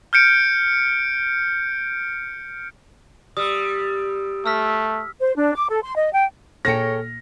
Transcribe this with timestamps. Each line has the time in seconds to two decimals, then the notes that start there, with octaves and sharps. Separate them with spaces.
0.13 F6 G6 C#7 D7
3.37 G3 D#6 E6
4.46 A3 E6 F6 B6
5.20 C5
5.35 D4
5.55 D6
5.70 A4
5.82 C6
5.97 D#5
6.13 G5
6.65 A#2 G#4 A4 C#5 G5 F6 A#6 C#7